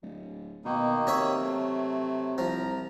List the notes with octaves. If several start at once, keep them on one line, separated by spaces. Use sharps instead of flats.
D1
B2 D#3 A#3 D#4
C3 C#4 C#5 E5
F#3 A3
C2 F3 A#5